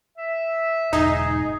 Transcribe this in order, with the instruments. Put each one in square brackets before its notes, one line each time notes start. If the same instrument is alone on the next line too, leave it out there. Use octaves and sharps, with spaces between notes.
[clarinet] E5
[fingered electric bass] E1 G#2 [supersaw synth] D#4 [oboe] G#4